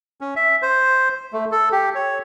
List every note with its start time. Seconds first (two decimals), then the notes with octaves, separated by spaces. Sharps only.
0.21 C#4
0.36 E5
0.62 C5
1.33 A3
1.52 A4
1.72 G4
1.95 C#5